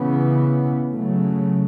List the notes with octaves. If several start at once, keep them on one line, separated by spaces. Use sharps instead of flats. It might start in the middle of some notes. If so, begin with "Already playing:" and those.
Already playing: C#3 E3 B3
C#3 F#3 A3